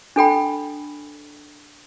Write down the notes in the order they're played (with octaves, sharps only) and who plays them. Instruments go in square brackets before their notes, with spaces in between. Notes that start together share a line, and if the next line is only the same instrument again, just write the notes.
[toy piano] D4 A4 G5 B5